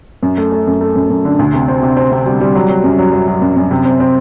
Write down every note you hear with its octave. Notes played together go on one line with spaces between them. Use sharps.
F#2
A3
A3
F#2
A3
F#2
F#2
D3
D2
C3
C4
C3
C4
C3
G3
G3
F#3
F#3
F#2
F#3
F#3
F#3
F#2
F#2
C3
C4
C4